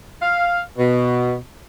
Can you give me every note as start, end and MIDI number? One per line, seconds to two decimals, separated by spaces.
0.22 0.61 77
0.78 1.34 47